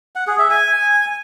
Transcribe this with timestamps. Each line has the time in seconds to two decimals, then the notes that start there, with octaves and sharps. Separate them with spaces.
0.16 F#5
0.27 G#4
0.39 E5
0.50 G#5